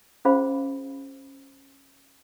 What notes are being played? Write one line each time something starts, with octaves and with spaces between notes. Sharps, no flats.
C#4 F4 G#4 C5 F5 B5